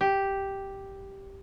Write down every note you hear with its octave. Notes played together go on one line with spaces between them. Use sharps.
G4